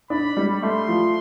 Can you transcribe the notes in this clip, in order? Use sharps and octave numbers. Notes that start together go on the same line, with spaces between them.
D4 B5
G3
A3 C6
F3